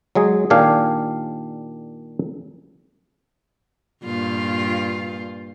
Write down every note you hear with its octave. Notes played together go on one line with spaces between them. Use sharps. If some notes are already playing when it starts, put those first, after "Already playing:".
F#3 G#3 G#4
A#2 D#3 D4 G4 F5 G#5
G2 A#2 F4